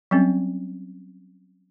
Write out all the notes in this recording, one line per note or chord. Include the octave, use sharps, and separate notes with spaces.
F#3 G3 C4 C#4